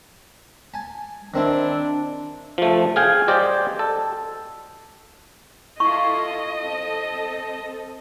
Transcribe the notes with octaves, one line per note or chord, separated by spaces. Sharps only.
G#5 A5
D#3 C4 D4 E4
F3 A3
G#4 F5 G5 G#5
G4 C5 D5 D#5 G5
A4
E4 F4 A4 D#5 C#6
C4 A4